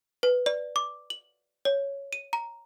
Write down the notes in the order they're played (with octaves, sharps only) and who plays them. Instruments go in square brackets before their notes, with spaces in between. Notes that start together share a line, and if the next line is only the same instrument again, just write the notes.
[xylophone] B4
D5
D6
F#7
C#5
D#7
A#5